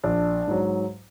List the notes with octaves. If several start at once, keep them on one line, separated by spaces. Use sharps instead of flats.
A#1 D4
G#2 F#3